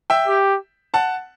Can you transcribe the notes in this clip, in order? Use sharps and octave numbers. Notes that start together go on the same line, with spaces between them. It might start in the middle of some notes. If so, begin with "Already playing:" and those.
E5 G5
G4
F#5 A5